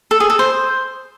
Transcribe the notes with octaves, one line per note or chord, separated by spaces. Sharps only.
A4
G#4
A4
C5